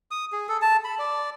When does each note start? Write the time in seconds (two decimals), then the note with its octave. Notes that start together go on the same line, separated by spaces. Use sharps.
0.11 D#6
0.32 G#4
0.49 A4
0.62 A5
0.84 B5
0.99 D5